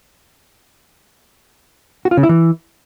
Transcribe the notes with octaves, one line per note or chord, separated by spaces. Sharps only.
F#4
F4
C#3
E4
E3